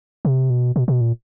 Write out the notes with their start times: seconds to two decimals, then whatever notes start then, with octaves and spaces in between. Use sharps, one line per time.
0.25 C3
0.50 B2
0.76 B2
0.88 B2
1.01 A#2